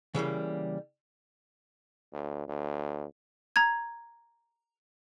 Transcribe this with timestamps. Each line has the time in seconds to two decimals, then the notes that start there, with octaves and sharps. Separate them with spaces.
0.14 C#3 E3 G3 A#3
2.13 D2
2.48 D2
3.56 A#5 G#6